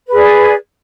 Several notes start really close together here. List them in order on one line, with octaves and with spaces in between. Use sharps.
B4 G#4 D5